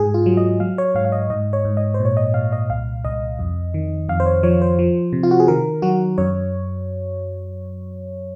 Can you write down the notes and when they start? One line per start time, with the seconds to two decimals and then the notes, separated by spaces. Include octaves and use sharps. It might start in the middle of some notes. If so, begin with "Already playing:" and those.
Already playing: G#2 G#4
0.14 F4
0.26 F#3
0.37 D#5
0.60 F#3 F5
0.78 C#5
0.95 G#2 F5
1.05 F5
1.12 D#5
1.30 G#2 D#5
1.53 C#5
1.65 G#2
1.77 D#5
1.94 C5
2.00 A#2
2.05 C#5
2.17 D#5
2.34 A#2 F5
2.52 D#5
2.70 C2 F5
3.05 C2 D#5
3.39 F2
3.74 D#3
4.09 F2 F5
4.20 C5
4.26 C#5
4.43 F3 C#5
4.62 C5
4.79 F3
5.13 C3
5.23 F4
5.31 F#4
5.40 G#4
5.48 D#3 A#4
5.82 F#3 F#4
6.18 F#2 C#5